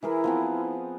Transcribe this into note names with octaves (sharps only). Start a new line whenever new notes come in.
E3 E4 G#4 A#4
F3 B3 C4